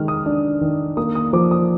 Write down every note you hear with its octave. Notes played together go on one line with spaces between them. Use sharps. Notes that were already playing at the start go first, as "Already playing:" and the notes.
Already playing: D#3 G#3 F6
D#6
D4
D#3
A#3 D#6
D#6
F3 D6
D#6